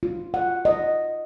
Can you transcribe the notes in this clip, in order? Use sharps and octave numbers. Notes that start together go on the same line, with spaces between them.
F4
F#5
D#5